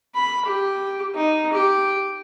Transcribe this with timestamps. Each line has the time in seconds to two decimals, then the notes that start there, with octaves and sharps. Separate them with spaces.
0.15 B5
0.45 G4
1.15 D#4
1.52 G4